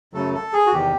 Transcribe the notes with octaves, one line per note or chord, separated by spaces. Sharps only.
F#2 C#3 F#3 A3 A4
A4
G#4
F#4
E2 C3 D#3 G4